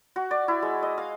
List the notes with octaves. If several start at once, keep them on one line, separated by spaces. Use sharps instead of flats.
F#4
D5
E4
G#3
D#5
F5